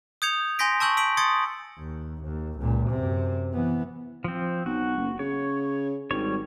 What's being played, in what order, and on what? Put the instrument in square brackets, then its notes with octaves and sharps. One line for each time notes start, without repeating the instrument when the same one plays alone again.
[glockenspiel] D#6 G6 G#6 C#7 F7
G#5 C6 G6 A#6 B6 D7
A5 C#6 E6 G6 F#7
E6 B6 D7 F#7
C6 D#6 G#6 A6 C#7
[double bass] D#2
D#2
C#2 A#2
F#2 C3
E3 B3
[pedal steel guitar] F3 C4
[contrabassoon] B1 [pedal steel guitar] F#4
[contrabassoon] F#1
[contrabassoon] C#3 [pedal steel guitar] C#5
[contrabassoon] G#1 [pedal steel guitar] G3 C#5